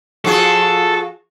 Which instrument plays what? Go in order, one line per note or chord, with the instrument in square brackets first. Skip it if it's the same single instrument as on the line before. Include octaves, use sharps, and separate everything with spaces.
[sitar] F3 F#4 G#4 [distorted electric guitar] A4